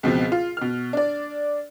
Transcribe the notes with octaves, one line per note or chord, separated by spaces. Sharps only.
C#2 B2 F3 C4
F4
B2 F6
D4 D5